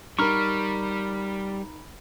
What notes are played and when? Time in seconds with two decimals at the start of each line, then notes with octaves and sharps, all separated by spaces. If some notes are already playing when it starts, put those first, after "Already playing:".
0.19 G3 D#4 A#4 A#5 B5 C#6 F6